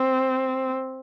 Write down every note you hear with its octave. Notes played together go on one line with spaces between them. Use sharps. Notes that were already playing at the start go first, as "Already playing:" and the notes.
Already playing: C4